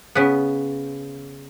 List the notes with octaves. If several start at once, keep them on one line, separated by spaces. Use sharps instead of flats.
C#3 B3